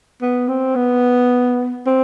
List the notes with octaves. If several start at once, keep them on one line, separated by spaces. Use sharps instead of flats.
B3
C4
B3
C4